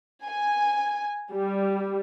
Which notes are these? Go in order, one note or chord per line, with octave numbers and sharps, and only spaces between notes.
G#5
G3